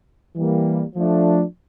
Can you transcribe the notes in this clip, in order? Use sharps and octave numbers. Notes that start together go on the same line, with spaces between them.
E3 G3 A#3
F3 A3 D4